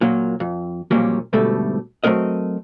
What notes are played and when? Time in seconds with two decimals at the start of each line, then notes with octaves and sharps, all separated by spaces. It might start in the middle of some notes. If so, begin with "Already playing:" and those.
0.01 A#2 F#3 A#3
0.40 F2
0.91 F2 A#2 F#3 G3 A#3 C#4
1.33 D2 G#2 B2 G3 A3 A4
2.04 F#3 A3 C4 A#4 D#5